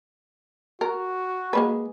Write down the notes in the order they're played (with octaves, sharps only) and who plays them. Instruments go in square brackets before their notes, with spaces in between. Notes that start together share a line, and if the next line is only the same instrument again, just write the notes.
[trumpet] F#4 [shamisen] A#4
[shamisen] G#3 A#3 B4